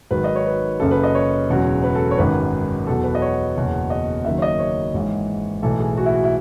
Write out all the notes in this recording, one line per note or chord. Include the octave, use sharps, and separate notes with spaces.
G#1 G#2 D#3 F#3 B4
D#5
C#5
B4
F#1 F#2 C#3 A4
B4
D#5
C#5
E1 E2 C#3 F#3
B4
A4
C#5
G#1 F#2 D#3 F#3 B4
E2 B2 F#3 A4
B4
D#5
C#5
F#1 E2 B2 F#3
D#5
F#1 F#2 D#3 F#3 E5
C#5
D#5
C#5
G#1 G#2 E3
B1 A2 E3 A4
G#4
F#4
E4
F#4
E4